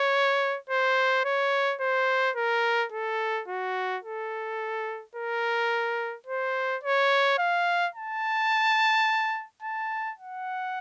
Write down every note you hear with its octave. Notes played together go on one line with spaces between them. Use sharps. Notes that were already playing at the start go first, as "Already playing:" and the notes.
Already playing: C#5
C5
C#5
C5
A#4
A4
F#4
A4
A#4
C5
C#5
F5
A5
A5
F#5